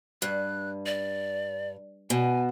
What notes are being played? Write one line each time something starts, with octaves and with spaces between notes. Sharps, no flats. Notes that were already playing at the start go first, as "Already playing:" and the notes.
G2 F#6
D5
B2 G#5